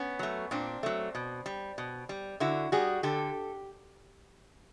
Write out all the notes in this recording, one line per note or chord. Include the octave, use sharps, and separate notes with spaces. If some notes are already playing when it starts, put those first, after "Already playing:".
Already playing: B3 C#4
F#3 A3
A#2 C4 D4
F#3 A3
B2
G3
B2
G3
D3 E4 F#4
G3 F#4 G#4
D3 G4 A4